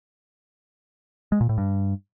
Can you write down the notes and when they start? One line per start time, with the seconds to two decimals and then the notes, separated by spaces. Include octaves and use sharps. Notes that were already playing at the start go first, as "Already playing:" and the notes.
1.32 G#3
1.41 A#2
1.49 A2
1.58 G2